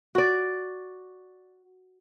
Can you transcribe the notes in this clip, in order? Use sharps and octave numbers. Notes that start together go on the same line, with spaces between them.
F#4 D5